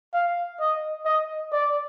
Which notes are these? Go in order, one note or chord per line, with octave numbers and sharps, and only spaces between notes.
F5
D#5
D#5
D5